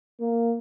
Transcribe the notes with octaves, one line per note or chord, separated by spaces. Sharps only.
A#3